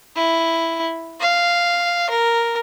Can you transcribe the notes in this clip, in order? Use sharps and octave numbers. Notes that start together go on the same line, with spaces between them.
E4
F5
A#4